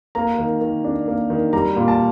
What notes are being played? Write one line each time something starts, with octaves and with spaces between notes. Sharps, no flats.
A#3 A#5
D#3
D#3
D4
A#3
D#3
G3 A#5
A#2
A5